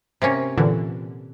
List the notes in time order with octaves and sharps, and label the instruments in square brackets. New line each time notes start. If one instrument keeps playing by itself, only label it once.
[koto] C3 A#3 C#4
[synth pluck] A#2 D3 E3